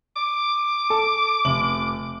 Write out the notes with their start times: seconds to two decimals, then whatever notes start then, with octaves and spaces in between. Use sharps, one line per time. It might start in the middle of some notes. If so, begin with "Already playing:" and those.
0.16 D6
0.90 A4
1.45 F1 F#7